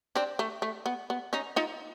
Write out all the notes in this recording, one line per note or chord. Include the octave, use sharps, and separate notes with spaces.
C4 D4
A3
A3
B3
B3
C#4 D#4
D#4 F4